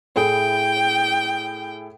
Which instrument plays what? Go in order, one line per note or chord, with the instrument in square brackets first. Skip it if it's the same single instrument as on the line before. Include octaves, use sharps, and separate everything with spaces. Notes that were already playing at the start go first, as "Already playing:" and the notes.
[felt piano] A2 E4 G#4 [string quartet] G5